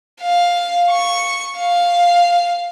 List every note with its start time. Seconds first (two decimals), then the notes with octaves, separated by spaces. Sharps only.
0.22 F5
0.91 C#6
1.58 F5